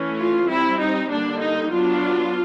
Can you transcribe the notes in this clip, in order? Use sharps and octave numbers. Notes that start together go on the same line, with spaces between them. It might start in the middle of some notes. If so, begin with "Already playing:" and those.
Already playing: E3 A3 C#4
F4
G3 C4 E4
D#4
D3 G3 A#3 D4
D#4
F#3 B3 D4 F4